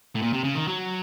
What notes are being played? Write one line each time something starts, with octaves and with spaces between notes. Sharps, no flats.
A2
A#2
C3
C#3
D#3
F#3